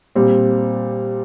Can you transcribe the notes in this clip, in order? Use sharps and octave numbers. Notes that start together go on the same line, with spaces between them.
A#2 G3 C4